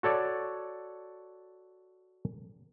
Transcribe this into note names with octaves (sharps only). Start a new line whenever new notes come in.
F#4 A4 C#5 D5